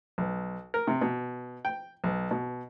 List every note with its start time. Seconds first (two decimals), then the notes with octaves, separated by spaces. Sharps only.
0.18 B1
0.74 A#4
0.87 C3
1.02 B2
1.65 G5
2.04 B1
2.31 B2